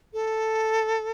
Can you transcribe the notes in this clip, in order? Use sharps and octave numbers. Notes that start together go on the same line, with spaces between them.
A4